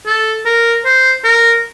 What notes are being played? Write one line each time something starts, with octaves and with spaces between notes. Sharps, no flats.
A4
A#4
C5
A#4